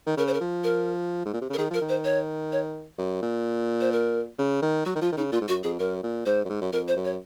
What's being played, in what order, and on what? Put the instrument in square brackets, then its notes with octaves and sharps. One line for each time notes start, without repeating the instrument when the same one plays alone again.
[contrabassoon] D#3
[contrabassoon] C#3 [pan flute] A#4
[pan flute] C5
A#4
[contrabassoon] F3
[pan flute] A#4
[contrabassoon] G#2
A#2
C3
C#3
[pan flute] A#4
[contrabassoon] D#3 [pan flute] G#4
[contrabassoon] F3 [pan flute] A#4
[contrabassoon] D#3
[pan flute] C5
C#5
C#5
[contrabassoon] F#2
A#2
[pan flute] C5
A#4
[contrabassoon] C#3
D#3
[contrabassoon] F#3 [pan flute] F#4
[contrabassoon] D#3
[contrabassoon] F3 [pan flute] F4
[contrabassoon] D#3
[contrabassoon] C#3 [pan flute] D#4
[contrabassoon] A#2 [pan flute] F4
[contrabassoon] G#2
[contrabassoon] F#2 [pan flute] F#4
[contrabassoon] F2 [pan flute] G#4
[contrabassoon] F#2 [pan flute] A#4
[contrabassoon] A#2
[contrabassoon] G#2 [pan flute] C5
[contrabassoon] F#2
G#2
F#2
[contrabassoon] F2 [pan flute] A#4
[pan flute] C5
[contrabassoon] F#2
[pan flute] C#5